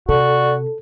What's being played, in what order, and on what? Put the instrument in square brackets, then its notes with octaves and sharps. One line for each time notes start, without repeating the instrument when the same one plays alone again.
[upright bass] C3 [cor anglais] F#4 [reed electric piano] A4 [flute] D5